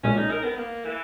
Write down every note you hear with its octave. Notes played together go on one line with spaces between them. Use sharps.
B1 A#2 G#3 C#4
D#4
A#4
B3
A#3
E3